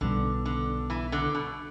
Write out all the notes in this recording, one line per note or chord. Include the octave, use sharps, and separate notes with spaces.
B1 B2 D3 G3
D3
E3
D3
B2